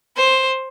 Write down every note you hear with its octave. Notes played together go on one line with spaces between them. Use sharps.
C5